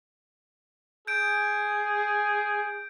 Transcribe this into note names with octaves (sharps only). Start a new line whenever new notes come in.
G#4 G6 D7